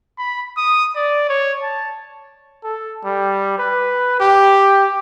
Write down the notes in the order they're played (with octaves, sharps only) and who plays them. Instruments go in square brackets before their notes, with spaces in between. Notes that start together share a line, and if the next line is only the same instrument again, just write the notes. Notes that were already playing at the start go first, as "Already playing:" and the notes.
[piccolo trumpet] B5
D#6
D5
C#5
A5
[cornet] A4
G3
B4
G4